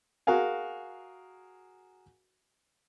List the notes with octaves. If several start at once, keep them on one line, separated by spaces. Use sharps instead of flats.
F#4 G#4 A#4 F5 G#5